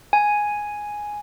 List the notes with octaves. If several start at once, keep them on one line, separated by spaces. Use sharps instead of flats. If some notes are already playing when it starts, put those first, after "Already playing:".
G#5